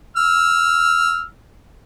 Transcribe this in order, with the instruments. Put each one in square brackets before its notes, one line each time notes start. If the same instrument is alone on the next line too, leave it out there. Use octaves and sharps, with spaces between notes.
[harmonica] E6 F6